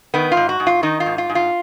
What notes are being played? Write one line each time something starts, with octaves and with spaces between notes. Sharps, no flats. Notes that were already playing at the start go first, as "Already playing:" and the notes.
D#3 B3
F4
G#2
F#4
G#2
F4
D#3 D#4
F4
G#2
F4
G#2
F4